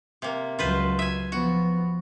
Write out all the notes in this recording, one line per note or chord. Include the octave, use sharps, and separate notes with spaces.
C3 A#3
C#2 F#3 F4 B4 C5
E5 G#5
F3 B3 F#4